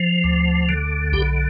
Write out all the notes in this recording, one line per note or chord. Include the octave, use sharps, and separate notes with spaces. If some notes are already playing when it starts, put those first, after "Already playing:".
Already playing: F3
D2
D3
B1 G4